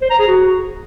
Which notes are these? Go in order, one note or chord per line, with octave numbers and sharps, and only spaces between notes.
C5
A#5
G#4
F#4